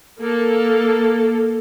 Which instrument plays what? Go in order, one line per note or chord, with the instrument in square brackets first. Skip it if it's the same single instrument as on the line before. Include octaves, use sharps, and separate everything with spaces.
[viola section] A#3 A4